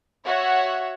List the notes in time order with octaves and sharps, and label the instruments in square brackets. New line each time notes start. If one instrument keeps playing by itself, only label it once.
[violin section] F#4 C#5 E5 F#5